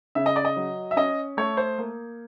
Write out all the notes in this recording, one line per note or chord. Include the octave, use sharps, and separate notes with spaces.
C#3 E5
D#5
D5
D#5
F#3
E5
C#4 D#5
A3 C#5
C5
A#3